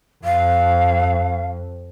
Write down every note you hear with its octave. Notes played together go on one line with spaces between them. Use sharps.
F2 F5